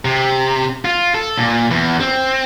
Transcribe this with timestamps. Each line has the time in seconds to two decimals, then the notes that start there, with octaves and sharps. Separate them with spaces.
0.05 C3
0.85 F4
1.14 A4
1.37 A#2
1.71 E2
2.00 C4